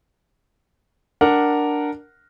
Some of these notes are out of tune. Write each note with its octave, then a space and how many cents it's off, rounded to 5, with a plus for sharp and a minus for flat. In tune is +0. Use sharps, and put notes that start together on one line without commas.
D4 +0 A#4 +0 F#5 +0